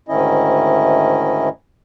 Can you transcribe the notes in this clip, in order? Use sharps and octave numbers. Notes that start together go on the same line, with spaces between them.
D2 G#2 D#3 C#4 E4 D#5